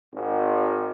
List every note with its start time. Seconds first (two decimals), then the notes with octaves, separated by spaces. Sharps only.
0.14 G#1